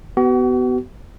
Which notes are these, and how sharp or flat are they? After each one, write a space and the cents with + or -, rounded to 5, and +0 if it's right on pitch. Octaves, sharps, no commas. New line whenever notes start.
B3 +15 F#4 +40